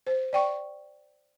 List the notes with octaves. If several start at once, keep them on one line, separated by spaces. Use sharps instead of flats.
C5
D5 G5 C#6